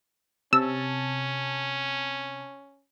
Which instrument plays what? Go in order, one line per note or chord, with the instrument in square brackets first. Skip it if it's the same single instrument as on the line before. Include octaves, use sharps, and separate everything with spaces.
[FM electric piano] C3 A5 [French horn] C#4 [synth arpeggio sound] E6